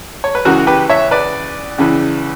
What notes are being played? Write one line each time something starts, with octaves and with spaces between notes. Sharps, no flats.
C#5
B4
C#2 C#3 E3 F#4 A#4
G4 B4
C#5 E5
B4 D5
C#2 C#3 E3